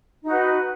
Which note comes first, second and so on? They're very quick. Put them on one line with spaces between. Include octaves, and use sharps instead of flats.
D#4 F#4 B4